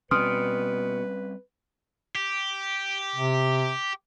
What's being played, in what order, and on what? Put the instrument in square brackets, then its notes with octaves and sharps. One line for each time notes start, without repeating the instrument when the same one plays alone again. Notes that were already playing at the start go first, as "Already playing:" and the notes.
[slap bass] B2 [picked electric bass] G3 C4 C#4 [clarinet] B4 [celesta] C6 D#6 F6
[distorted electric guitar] G4
[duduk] C3